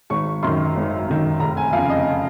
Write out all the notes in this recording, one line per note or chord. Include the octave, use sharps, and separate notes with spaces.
G#1 C#6
F#2 D#3 C6
G#1
F#2 D#3
F1 A#5
G#5
F2 C#3 F5
D#5